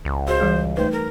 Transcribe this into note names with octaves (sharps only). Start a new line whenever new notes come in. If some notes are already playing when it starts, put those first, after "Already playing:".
C#2
F#4 G#4 C5
E3 G3 G#4
A3 D#4 B4 C5
A#4